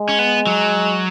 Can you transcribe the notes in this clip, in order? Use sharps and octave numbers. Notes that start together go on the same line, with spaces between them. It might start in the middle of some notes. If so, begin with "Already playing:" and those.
Already playing: G#3
C#4
B3
F#3